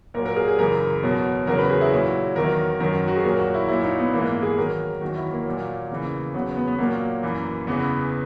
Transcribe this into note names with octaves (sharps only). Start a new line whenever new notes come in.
A#2 F#3 A#4
A#4
G#4
G#4
F#2 C#3 E3 A#4
E2 B2 F#3
E2 C#3 F#3 A#4
B4
G#4
E4
A#2 F#3
E2 D#3 F#3 A#4
F#2 D#3 F#3 A#4
F#4
G#4
A#2 F#3 A#4
F#4
E4
A#2 F#3 E4
D#4
B3
G#2 E3 A#3
B3
G#4
E2 D#3 F#3 A#4
E2 D#3 F#3 F#4
E4
A#3
A#2 F#3
E2 C#3 E3
E2 C#3 F#3 B3
C#4
B3
B3
A#2 F#3 A#3
F#2 E3
E2 C#3 E3 B3